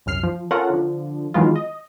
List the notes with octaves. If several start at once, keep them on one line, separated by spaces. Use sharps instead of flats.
C2 F#2 F6 C7
F3
C#4 F4 A4 A#4 F#5
D3 F3
D#3 E3 F#3 G#3 B3 F4
D#5